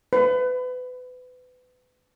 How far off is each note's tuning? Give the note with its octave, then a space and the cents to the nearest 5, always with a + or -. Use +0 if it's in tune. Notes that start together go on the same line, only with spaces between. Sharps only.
B4 +30